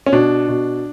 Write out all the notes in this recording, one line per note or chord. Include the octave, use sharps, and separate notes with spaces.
C#4
B2 D4
B2